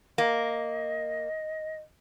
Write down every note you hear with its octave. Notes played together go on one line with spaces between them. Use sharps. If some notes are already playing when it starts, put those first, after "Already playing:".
A#3 D#5